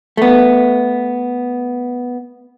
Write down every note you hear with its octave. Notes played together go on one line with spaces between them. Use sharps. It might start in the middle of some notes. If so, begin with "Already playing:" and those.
A3 B3